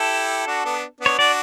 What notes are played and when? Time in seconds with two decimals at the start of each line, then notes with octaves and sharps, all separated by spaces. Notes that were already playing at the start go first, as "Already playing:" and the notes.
Already playing: E4 G4 A4
0.47 D4 F#4
0.65 B3 D4
1.00 B3 D4
1.06 C#5
1.19 D4 F#4 D5